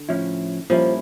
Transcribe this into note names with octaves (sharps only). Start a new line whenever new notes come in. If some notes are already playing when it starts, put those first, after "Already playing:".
Already playing: D3
A2 F3 C#4 E4
A#2 F3 G3 A#3 C#4 E4